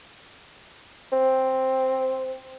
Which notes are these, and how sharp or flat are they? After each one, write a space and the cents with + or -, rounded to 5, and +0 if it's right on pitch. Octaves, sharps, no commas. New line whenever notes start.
C4 +5